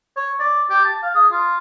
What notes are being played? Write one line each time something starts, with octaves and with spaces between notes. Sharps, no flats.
C#5
D5
G4
A5
F5
G#4
F4